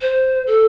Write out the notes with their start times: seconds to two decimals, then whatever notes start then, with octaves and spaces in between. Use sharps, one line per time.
0.01 C5
0.46 A4